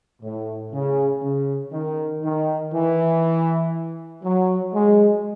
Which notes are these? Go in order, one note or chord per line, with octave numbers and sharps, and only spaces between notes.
A2
C#3
C#3
D#3
D#3
E3
F#3
G#3